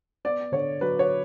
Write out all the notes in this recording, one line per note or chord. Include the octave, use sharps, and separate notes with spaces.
B3 D5
D3 C#5
F#3 B4
C#5